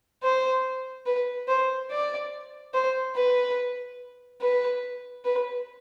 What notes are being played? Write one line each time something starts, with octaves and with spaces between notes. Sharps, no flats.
C5
B4
C5
D5
C5
B4
B4
B4